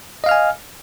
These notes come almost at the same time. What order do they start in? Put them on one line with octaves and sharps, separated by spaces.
D#5 F5 F6 G#5